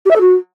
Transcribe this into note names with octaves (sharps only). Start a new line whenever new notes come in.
G4
E5
A4
F#4